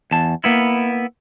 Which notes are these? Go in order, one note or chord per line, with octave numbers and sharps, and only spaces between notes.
E2 A5
A#3 B3 E4